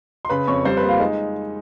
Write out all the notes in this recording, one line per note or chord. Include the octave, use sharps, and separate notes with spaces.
C6
C#3 B4 B5
F2 C#5 C#6
G3 C5 C6
B4 B5
A#3
F4 F5
G#3 D#4